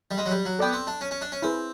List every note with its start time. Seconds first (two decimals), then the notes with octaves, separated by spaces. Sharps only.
0.11 G3
0.18 G#3
0.26 F#3
0.31 G3
0.45 F#3
0.59 B3 A4 D5 G5
0.73 C4
0.87 D4
1.01 C#4
1.11 C#4
1.21 D4
1.32 C#4
1.42 C4 E4 G#4 B4